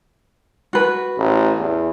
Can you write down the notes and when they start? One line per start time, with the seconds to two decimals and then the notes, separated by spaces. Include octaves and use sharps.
0.73 F#4 B4
1.18 A1
1.58 E2